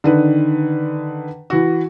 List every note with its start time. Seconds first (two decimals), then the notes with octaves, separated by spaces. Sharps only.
0.04 D3 D#3 B4
1.50 E3 F#4